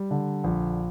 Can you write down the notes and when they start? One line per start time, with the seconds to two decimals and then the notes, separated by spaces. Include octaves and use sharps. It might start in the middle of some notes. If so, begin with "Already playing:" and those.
Already playing: G3
0.11 D3
0.44 A#1